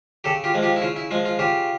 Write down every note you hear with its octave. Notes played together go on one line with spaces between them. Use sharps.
C#3 G4 A4
F4 G4
F3 G#3
F4 G4
E4
C#3 F4
E4
F3 G#3 F4
F4
C#3 F4 G4